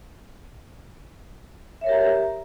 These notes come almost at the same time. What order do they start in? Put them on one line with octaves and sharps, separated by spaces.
E5 C#5 A#4 G4 A#5